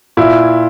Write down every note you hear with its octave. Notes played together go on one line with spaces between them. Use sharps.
A#2 E4